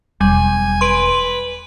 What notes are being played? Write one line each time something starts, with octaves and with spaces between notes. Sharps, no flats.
E1 F#3 G3 G#5
B4 C6 D7